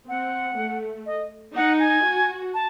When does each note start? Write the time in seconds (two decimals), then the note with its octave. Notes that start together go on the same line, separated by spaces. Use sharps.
0.09 C4 F#5
0.58 A3
1.06 D#5
1.56 D#4 F#5
1.79 G#5
2.04 F#4
2.54 A5